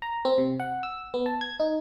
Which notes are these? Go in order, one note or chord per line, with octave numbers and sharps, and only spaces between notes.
A#5
C4
C3
F#5
E6
B3
A5
G#6
D#4